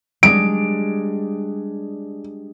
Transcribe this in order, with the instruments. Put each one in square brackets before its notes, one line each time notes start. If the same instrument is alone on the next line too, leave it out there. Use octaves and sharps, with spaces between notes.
[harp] G3 G#3 D4 [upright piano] D7